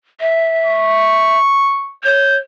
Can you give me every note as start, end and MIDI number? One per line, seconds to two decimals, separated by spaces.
0.21 1.38 76
0.65 1.95 85
2.04 2.38 73
2.04 2.38 91